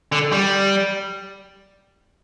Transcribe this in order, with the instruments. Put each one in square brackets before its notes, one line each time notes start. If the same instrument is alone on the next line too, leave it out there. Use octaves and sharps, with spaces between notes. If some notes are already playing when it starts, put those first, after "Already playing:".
[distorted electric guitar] D3
G3